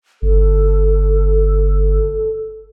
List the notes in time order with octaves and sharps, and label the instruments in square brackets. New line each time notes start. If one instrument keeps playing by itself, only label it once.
[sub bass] G1 [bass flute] A4